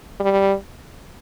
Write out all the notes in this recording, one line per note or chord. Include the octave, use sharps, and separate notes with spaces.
G3